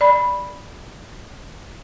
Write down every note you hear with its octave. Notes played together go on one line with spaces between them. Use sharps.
D5 B5